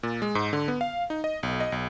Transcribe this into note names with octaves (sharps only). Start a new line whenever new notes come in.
A#2
G#3
G#2
D3
B3
F5
D#4
D#5
B1
D#5
B1